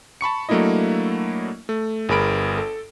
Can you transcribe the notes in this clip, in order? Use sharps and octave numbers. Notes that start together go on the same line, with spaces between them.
A5 B5 C#6 C#7
F#3 A3 A#3 D4 E4 D#5
A3
G1 G#4 A#4 B5 D7
A4